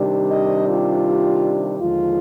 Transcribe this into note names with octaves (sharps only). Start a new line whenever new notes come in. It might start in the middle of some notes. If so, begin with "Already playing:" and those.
Already playing: C3 D#3 G3 D4
D#5
F4
D#2 D3 F3 G#3 F4